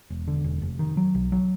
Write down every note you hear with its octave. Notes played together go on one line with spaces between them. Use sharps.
E1
D3
E1
F1
D#3
F#3
B1
F#3